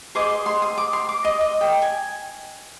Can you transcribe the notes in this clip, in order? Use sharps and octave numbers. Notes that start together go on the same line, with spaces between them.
G#4 C5 D#5 D6
C6
C6
D#6
D6
C6
D6
D#5
D#5
G5
G#5